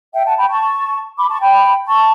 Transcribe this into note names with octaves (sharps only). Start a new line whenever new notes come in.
E5 G5
F#5 A5
G5 B5
A5 C#6
B5 D6
A5 C#6
G5 B5
A5 C#6